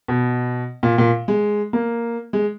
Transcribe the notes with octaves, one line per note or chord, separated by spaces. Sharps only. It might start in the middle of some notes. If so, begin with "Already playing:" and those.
B2
A#2
A#2
G#3
A#3
G#3